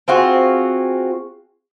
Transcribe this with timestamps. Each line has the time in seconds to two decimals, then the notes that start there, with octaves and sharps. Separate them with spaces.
0.08 C4 F4 F#4 G#4